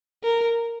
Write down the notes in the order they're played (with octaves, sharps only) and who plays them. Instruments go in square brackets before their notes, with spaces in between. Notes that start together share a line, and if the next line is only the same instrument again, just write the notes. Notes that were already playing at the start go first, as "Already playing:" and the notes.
[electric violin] A#4